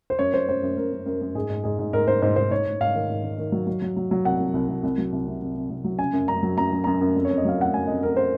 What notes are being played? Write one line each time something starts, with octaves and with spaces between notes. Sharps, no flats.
C5
F#2 C#5
F#2 C5
F#2 C5
F#2
F#2 A#4
F#2
F#2 A#4
F#2
G#2 G#4
G#2
G#2 G#4
G#2
G#2 A#4
G#2 C5
G#2 C5
G#2 C5
G#2 C#5
G#2
G#2 F5
D#3
G#2
D#3
D#3
F#3
F#3
F#3
F#3
F#3
C2 F#5
C2
C2
C2
C2
F#3
C2
C3
C3
C3
C2
F#3
C#3 G#5
F#2
F#2 A#5
F#3
F#2 A#5
F#2
F#2 A#5
F#2
F2
C#5
F2
D#5
F#3 F5
F2 F#5
F#3 G#5
F2 D#5
F2 A#4
C5